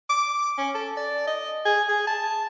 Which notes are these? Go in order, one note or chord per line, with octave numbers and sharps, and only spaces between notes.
D6
C#4
A4
D5
D#5
G#4
G#4
A5